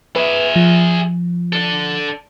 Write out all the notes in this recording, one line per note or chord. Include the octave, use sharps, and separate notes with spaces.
G#4 B4 E5
F3
D4 A4